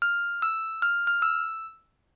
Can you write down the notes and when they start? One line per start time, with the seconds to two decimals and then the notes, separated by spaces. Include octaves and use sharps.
0.02 F6
0.42 E6
0.82 F6
1.07 F6
1.22 E6